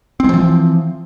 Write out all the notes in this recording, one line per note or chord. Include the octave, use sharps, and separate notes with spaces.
E3 F3 G#3 C4